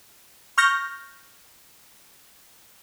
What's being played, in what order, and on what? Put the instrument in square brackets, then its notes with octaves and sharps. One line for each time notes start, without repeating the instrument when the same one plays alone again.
[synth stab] C#6 F6 G6 A#6